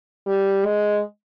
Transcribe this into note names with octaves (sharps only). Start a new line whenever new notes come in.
G3
G#3